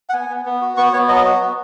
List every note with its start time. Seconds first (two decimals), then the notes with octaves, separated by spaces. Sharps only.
0.09 F#5
0.13 B3 G#5
0.29 B3
0.46 B3
0.61 F#4
0.77 B3 C#6
0.93 B3 C#5
1.08 F#3 D#5
1.25 F#4
1.40 B3